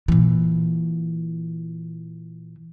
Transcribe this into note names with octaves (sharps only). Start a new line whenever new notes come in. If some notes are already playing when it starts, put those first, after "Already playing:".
A#2 E3